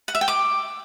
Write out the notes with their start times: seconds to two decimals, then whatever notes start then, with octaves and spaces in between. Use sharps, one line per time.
0.08 F#5
0.15 E5
0.21 G5
0.28 D6